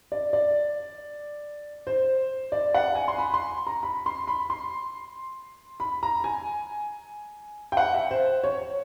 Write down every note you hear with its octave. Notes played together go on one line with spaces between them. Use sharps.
D5
D5
C5
D5
F#5
G#5
C6
B5
C6
A#5
B5
C6
B5
C6
B5
A#5
G#5
G5
F#5
E5
C5
C#5